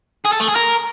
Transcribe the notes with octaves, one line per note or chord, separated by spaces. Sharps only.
G#4
A4
A3
G#4
A#4